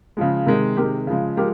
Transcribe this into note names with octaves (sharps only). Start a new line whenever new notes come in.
C#3 F3 G#3
C3 D#3 G#3
C3 D#3 G#3 G4 A#4
C#3 F3 G#3
F3 G#3 G4 A#4